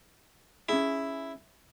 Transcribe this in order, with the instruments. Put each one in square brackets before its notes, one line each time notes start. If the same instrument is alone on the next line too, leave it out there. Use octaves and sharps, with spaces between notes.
[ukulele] C#4 G#4 [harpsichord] E4